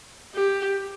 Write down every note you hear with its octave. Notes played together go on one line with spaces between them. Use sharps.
G4